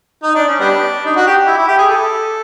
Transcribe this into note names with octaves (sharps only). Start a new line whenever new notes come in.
D#4
D4
C#4
G3 B3 D4
D#4
F#4
G4
E4
E4
G4
G#4
A4